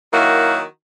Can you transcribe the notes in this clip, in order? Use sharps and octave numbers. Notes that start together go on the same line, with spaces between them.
D#3 F#3 A#3 E4 F#4